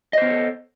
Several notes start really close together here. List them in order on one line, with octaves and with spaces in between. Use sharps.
D#5 C5 B3 C#5 A4